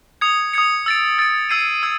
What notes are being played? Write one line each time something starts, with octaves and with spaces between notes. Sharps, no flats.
D#6 G#6 C#7
D#6 G#6 C#7
E6 A6 D7
E6 A6 D7
E6 G#6 C7 D#7
E6 G#6 C7 D#7